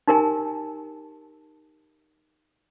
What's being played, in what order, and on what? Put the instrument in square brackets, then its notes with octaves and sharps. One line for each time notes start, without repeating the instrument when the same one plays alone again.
[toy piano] D#4 G4 A#4 G#5 A5